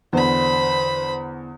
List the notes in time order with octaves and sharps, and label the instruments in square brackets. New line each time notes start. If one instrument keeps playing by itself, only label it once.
[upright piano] E2 D3 [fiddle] C5 B5